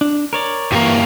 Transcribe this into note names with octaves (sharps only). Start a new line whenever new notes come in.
D4
A#4 C#5 D5
G2 E3 A#3 C#6